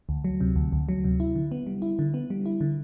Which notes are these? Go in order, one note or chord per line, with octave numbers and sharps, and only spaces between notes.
D2
F#3
C3
D2
D2
F#3
C3
E4
D3
B3
G3
E4
D3
B3
G3
E4
D3